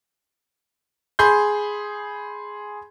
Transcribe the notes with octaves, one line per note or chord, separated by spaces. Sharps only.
G#4 B5 C6 G6